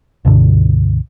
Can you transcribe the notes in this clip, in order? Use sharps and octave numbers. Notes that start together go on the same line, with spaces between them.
C#2 G2 B2 D3